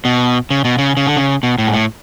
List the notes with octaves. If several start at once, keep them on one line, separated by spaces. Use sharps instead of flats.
B2
C#3
B2
C#3
C#3
D3
C#3
B2
A2
G#2
A2